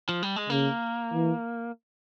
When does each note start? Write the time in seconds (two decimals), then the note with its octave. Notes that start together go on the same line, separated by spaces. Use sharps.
0.09 F3
0.23 G3
0.36 G#3
0.50 C#3 A#3
1.13 E3